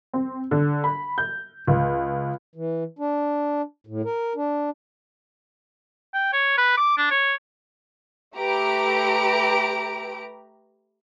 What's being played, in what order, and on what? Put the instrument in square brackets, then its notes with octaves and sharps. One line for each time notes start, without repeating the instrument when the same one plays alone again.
[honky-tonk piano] C4
D3
B5
G6
C#2
[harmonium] E3
D4
A2
A#4
D4
[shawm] G5
C#5
B4
D6
D4
C#5
[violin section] A3 G4 B4 A#5 D7